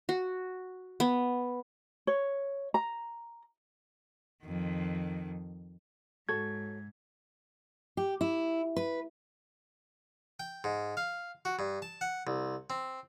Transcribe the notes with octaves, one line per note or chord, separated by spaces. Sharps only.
F#4
B3
C#5
A#5
F2 D#3
G#2 F#4 A4 C#5 G#6
G4
E4
B4
G5
G#2
F5
F#4
G2
A5
F#5
C2
C4